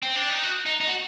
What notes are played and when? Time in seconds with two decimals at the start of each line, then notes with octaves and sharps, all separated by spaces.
0.03 C4
0.16 D4
0.30 D#4
0.44 F#4
0.66 D#4
0.81 D#4
0.87 F#4